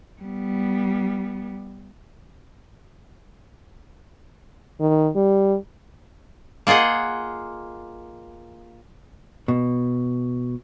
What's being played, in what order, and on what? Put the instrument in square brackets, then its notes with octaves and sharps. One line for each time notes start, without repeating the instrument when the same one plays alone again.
[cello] G3 B3
[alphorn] D#3
G3
[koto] A#3 F4 G#4 D#5 F#5
[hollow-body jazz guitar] B2